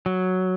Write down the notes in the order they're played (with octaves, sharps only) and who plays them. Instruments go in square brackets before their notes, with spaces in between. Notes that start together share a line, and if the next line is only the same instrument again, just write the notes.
[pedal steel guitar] F#3